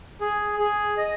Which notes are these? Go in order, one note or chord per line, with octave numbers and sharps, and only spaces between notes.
G#4
G#4
D#5